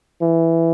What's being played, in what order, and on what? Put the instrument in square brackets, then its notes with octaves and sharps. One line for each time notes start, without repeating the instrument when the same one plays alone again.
[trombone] E3